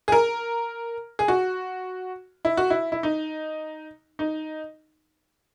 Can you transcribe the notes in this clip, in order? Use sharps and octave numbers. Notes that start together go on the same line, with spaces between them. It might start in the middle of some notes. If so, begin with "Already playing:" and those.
G#4
A#4
G#4
F#4
E4
F#4
E4
E4
D#4
D#4